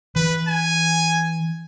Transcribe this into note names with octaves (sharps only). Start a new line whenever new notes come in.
E3 B4
G#5